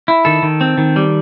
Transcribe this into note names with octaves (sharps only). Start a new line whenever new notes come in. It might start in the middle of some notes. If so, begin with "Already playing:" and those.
E4
D#3 A4
D#3
C4
D#3
G3